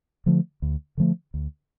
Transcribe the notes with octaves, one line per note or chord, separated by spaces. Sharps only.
D3 F3 A3
D2
D3 F3 A3
D2